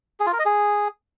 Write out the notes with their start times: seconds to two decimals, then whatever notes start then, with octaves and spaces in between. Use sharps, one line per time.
0.20 G#4
0.26 F4
0.33 A#4
0.39 D#5
0.45 G#4